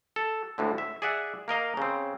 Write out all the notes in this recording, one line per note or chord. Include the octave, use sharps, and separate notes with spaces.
A4
D2 A2 D3
E5
G#4 D5 E5 F#5
A#3 A#4 D#5 F5
C#3 C4